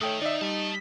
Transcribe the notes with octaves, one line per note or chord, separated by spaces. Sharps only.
D#3 A3 C#5 G5 D#6
D#4 D5 E5
G3 E5 A5